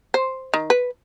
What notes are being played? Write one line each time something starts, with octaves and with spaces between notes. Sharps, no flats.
C5
D#3
B4